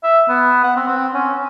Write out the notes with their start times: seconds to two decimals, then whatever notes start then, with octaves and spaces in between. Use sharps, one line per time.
0.04 E5
0.28 B3
0.64 F#5
0.76 C4
0.88 C4
1.14 C#4